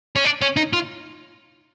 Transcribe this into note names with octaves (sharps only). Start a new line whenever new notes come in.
C#4
D4
C#4
D#4
F4